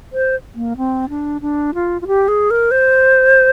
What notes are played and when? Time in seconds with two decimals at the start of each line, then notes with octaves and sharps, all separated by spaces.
0.13 C5
0.55 A#3
0.77 C4
1.09 D4
1.41 D4
1.74 F4
2.02 F4
2.07 G4
2.28 G#4
2.51 A#4
2.71 C5